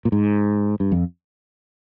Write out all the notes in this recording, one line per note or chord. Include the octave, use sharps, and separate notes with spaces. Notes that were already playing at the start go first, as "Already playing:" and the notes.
A#2
G#2
G2
F2